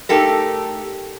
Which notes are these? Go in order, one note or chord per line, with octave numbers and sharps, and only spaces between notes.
A3 D#4 G4 A4 A#4